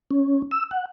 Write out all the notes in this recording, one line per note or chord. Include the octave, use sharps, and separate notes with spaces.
C#4
E6
F#5